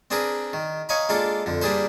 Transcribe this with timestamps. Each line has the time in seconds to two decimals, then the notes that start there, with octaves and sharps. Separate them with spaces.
0.11 C4 D4 G#4 A#4 B4
0.53 D#3
0.89 C#5 D#5 F5 G#5 A#5 B5
1.09 G#3 A#3 D4 F4 A4
1.46 F2 D3
1.62 G3 A#3 D4 G#4 B4 C5